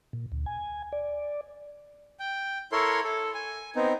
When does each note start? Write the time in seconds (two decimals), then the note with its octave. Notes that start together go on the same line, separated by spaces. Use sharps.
0.13 A#2
0.32 D2
0.46 G#5
0.93 D5
2.20 G5
2.72 E4 A4 A#4 C#5 C6
3.04 A4
3.34 G#5
3.76 B3 C4 D#4